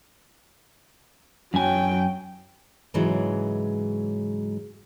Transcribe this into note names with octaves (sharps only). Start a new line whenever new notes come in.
F#2 F#3 G5 G#5
G#2 C#3 E3 F#3 G#3